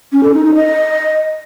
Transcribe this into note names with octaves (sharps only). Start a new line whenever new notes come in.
C#4
A4
D#4
D#4
D#5